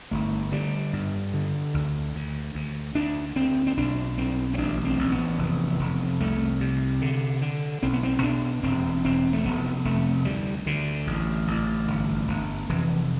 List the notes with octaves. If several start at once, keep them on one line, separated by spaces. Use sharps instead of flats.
G1 A3
D3 G3
G2
D3
D2
D2
D2
D2 D4
D2 C4
C4
B1 D4
B1 C4
C4
A1 D4
C4
A1
B3
F1
F1
C2 A3
C3
D3
D3
B1 C4
B3
C4
B2 D4
E1 C4
E1 C4
A3
F1 B3
F1 A3
D2 G3
D2 D3
A1
A1
G1
G1
F1 E3